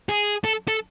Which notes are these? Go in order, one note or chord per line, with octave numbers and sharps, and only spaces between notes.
G#4
A4
A4